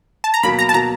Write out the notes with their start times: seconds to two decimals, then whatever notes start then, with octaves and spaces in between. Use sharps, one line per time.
0.24 A5
0.34 A#5
0.43 B2 F#3 A#3 B5
0.59 A#5
0.69 A5
0.74 B2 F#3 A#3 A#5